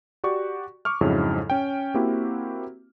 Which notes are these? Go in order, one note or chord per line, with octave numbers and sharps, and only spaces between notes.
F#4 G4 D5 C#6
C#6 D6 F6
F2 G#2 C#3 F#3 E4
C#4 G5
A#3 C4 E4 F#4 G4